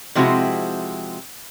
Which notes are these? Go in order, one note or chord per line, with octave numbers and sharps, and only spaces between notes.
C3 F3 G#3 C4 E4 F#4